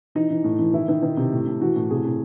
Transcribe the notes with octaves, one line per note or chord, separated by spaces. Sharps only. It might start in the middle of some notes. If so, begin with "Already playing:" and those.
E3 D#4
E3
A2
E3
D#3 E4
D#3
D#3
C3
A2
A2
E3 F#4
A2
C3 G#4
C3